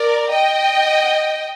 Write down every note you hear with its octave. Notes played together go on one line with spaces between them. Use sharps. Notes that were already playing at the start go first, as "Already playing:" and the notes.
Already playing: A#4 D5
D#5 G5